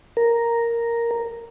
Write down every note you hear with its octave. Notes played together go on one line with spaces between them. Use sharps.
A#4